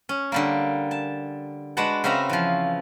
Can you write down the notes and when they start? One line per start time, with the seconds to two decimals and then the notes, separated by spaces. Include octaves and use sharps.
0.09 C#4
0.32 D3 G3 A#3
0.91 A5
1.77 G#3 D4 F#4 B4 F#5 A5
2.04 C#3 C4 F#4 B4 E5 A#5
2.29 E3 F3